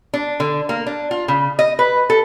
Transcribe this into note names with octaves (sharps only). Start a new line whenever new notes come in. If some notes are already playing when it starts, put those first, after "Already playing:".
D4
D3
A#3
D4
F4
C#3
D#5
B4
A4